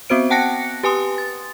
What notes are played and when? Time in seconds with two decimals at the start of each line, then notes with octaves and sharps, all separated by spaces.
0.10 B3 C4 F#4 C5 D7
0.30 F#5 G5 A5 F#6 A#6 C#7
0.83 G4 B4 G#5 C6 D#6
1.18 A6